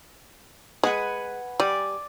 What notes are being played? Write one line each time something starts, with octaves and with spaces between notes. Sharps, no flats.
G#3 B4 F#5 G#5
G3 D5 G#5